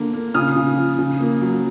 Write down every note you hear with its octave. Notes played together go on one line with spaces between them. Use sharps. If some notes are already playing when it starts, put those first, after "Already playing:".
Already playing: D3 A#3
A#3
C#3 D#6 F6
C#3
F3
C#3
A#3
F#3